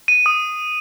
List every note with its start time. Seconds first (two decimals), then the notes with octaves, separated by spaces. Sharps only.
0.08 D#7
0.26 D#6